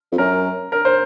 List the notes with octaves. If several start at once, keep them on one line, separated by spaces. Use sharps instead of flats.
F2
F#2 A#4
A#4
C5